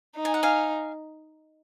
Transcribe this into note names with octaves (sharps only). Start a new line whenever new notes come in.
D#4
G#5
F#5
F5 G#5